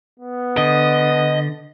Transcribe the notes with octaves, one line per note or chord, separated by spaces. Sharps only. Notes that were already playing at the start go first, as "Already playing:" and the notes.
B3
D3 D#5